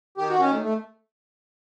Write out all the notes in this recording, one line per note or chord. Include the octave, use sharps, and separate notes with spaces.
D#3 G4
F#4
D#3 C#4
A3
A3